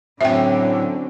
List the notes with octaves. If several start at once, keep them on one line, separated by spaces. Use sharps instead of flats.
A2 D3 F#3 C4 C#4 F#4 E5 G5